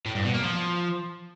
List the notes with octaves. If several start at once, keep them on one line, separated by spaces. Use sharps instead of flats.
A2
G2
B2
A#3
F3